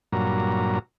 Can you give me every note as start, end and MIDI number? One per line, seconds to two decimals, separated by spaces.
0.13 0.79 43
0.13 0.79 46
0.13 0.79 54
0.13 0.79 82